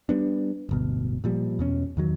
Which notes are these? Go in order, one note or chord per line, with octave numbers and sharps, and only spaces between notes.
G3 B3 D4
D1 G1 B2
A#2 F3 G3
E2 B2 C#4
E2 D#3 F#3